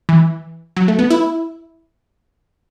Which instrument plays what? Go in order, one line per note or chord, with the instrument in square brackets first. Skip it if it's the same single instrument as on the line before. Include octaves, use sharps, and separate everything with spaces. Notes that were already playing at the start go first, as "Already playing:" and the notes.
[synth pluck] E3
F#3
A3
B3
E4